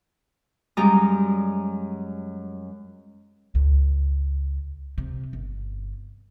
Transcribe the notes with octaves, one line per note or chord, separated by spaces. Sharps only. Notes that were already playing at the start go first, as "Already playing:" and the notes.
F#2 G3 G#3 D5 A#5 D#6
C#2
C3
G1